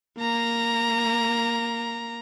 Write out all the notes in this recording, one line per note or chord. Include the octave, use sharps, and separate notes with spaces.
A#3 A#5